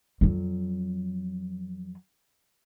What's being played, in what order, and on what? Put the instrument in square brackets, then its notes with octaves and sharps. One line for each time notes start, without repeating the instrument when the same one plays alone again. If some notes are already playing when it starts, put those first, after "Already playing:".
[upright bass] F2 F#3